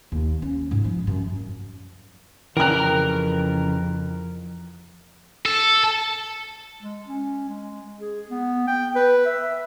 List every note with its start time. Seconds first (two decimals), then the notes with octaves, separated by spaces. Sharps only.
0.12 D#2
0.42 C#4
0.71 G#2
0.84 F3
1.07 F#2
2.57 F2 C#3 E3 A#4 G5 A#5 F#6
5.46 A4
6.82 G#3
7.07 C#4
7.48 G#3
8.00 G#4
8.30 B3
8.67 G5
8.95 B4
9.26 E5